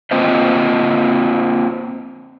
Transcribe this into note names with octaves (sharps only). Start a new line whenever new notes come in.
A#3 C4 F4 B4 C5 D#5